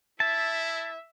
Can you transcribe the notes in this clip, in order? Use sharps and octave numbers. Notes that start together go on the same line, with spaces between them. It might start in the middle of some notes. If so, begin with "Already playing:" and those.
E4 E5 A5